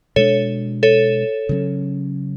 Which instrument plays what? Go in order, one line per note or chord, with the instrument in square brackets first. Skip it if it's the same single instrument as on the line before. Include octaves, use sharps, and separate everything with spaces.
[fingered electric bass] B2 G#3 B3 D4 [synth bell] A4 C#5
[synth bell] A4 C#5
[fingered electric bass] C#3 F#3 C#4